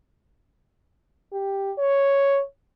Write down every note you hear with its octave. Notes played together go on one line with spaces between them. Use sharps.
G4
C#5